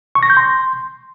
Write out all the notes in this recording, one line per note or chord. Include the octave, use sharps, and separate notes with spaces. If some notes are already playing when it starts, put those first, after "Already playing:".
C#6
A#6
G6
C6